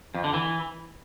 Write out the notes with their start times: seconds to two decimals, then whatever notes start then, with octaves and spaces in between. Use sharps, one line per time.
0.14 F2
0.24 D3
0.33 E3